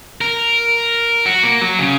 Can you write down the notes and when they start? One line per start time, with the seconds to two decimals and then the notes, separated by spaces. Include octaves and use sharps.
0.21 A#4
1.26 F#4
1.43 A#3
1.61 F#3
1.79 C#3